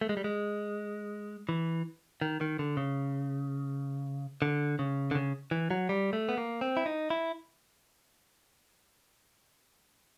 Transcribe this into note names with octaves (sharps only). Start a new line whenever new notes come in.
A3
G#3
G3
G#3
E3
D#3
D#3
D3
C#3
D3
C#3
D3
C#3
E3
F#3
G3
A3
B3
A#3
C4
E4
D#4
E4